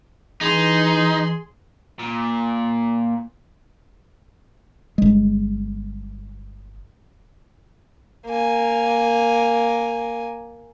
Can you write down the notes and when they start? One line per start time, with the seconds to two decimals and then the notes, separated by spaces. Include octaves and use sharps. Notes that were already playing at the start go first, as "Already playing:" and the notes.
0.41 E3 D#4 G#4 C6
1.99 A#2
4.98 G1 G#3
8.26 A#3 G#5